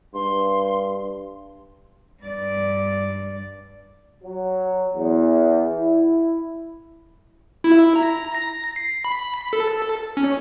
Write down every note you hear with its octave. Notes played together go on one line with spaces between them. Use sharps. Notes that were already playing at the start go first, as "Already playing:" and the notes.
G2 C6
G2 D5
F#3
E2
E4
E4
A#5
A#6
C7
B5
A4
C#4